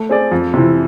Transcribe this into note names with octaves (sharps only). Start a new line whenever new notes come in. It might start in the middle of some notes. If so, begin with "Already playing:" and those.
Already playing: A3
C4 G#4 D5
F2
C3 E3